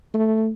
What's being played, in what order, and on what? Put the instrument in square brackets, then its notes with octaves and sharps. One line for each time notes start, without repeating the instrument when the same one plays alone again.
[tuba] A3